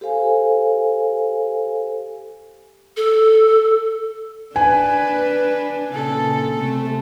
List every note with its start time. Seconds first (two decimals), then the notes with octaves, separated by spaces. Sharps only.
0.01 G4 A4 C5 F5 G#5
2.97 A4
4.56 D4 B4 G#5
5.93 A#2 C#3 A4
6.58 C3 A3